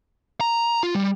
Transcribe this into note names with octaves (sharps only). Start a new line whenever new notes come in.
A#5
F4
G3